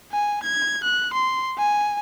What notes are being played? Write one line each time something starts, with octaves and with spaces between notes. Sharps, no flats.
G#5
G#6
F#6
C6
G#5